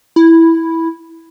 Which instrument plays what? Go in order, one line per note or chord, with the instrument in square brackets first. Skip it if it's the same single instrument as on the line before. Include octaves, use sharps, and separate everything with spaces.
[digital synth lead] E4